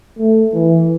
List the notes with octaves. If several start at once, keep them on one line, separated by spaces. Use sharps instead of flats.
A3
E3